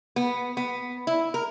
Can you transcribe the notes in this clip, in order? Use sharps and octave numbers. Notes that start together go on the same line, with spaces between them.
B3
B3
E4
A#4